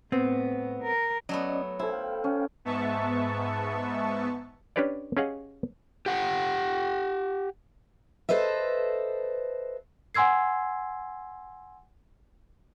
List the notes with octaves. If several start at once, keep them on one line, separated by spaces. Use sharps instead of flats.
A2 B3 C4
A#4
F#3 A3 B3 C#4 D5 D#5
E4 A4 C5 E5 G#5
F5 G5
C#4
G#2 B3 E5 A5 C#6
C#4 D4 G4 B4 C#5 D5
C#4 G4 G#4 D#5 F5 F#5
G4 F#5 G5
A4 B4 C5 D#5 E5
F#5 G#5 C6 E6 G#6 C7